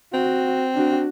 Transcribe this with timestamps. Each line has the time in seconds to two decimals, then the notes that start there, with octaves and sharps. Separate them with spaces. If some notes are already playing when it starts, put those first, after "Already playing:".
0.13 C4 F#4
0.74 D4 F#4